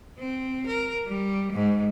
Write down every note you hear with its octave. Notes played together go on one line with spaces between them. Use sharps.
C4
A#4
G3
G#2